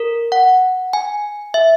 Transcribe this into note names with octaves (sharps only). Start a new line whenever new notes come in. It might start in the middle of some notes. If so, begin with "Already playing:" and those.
Already playing: A#4
F#5
G#5
E5